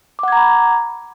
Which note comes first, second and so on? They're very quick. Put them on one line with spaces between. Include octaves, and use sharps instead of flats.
D6 F#5 G#6 A#5 B5